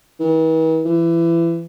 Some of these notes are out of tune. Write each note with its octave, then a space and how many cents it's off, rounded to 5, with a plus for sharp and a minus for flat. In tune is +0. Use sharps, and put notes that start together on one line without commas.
E3 -45
E3 +25